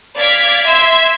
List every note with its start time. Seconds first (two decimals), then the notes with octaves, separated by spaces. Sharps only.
0.16 D5 F5 G#6 B6 D7
0.65 E5 C6 G#6